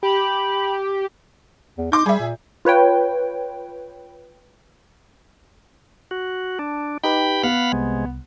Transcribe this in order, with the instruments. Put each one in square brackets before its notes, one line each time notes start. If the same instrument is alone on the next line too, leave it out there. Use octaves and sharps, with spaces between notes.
[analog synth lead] G4 [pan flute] B5
[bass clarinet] E2
[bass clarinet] D#4 [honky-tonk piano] C6 D6 G6
[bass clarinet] G3 [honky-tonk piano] G#4 E5
[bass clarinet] A#2
[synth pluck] F4 B4 C#5 G5
[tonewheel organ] F#4
[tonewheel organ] D4 [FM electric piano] A5
[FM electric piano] D#4 G4 B4 [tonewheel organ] G5 B5
[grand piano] B3 [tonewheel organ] F5 F#5 B5
[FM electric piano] C2 [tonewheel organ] C3 G#3